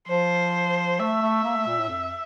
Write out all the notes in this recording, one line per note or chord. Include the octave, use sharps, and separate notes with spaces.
F3 C5
A3 E5
A3
A#3
A3
A#2
A2
F2